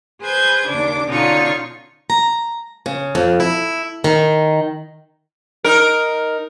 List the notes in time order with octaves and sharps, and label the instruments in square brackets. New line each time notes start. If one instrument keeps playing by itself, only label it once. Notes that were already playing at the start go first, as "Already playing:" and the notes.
[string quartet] G#4 B4 C5 G6 G#6
D#2 C#3 D4 D6
B2 D3 C#4 D#4 F4 C#6
[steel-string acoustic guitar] A#5
C#3
F2
E4
D#3
[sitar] D#4 A#4